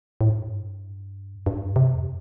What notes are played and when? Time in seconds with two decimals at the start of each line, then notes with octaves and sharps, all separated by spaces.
0.21 A2
0.29 G2
1.46 G2
1.76 C3
1.94 F2